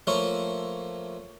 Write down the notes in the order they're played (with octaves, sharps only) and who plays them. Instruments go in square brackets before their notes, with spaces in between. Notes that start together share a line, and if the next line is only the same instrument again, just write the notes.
[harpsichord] F3 A3 A#3 F4 C5 C#5